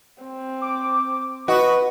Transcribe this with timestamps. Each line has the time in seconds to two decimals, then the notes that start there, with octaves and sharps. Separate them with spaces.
0.23 C4
0.61 D6
1.48 F#4 B4 D#5